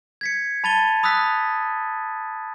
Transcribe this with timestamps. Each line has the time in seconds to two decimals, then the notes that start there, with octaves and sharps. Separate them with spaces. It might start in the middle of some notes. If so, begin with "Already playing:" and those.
0.21 G#6 B6 C#7
0.64 A5 B5 A6 D#7 G7
1.03 B5 D#6 E6 F#6 B6